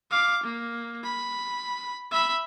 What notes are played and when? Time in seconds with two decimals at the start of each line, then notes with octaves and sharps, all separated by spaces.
0.11 F5 D6
0.44 A#3
1.04 B5
2.11 E5 B5